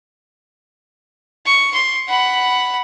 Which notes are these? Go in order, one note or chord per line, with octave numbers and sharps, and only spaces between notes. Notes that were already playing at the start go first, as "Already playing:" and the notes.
C#6
C6
F#5 B5